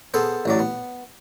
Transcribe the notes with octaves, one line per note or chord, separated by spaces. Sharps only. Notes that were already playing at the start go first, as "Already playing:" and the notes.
B3 G#4 A4 C5
A1 F#3 D5
B3